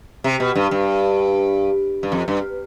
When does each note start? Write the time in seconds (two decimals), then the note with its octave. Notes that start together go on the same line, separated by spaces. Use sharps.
0.24 C3
0.40 B2
0.55 G2
0.71 G2
2.03 G2
2.12 F2
2.28 G2